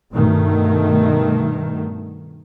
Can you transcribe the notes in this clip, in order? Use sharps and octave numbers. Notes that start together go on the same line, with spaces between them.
G2 B2 D#3 A3